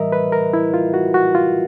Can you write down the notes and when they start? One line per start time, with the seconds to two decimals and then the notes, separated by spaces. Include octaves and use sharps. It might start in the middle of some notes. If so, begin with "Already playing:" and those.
Already playing: A2 E3 G3 A#4 D#5 E5
0.12 B4
0.32 A#4
0.53 E4
0.74 F4
0.94 F#4
1.14 F#4
1.35 F4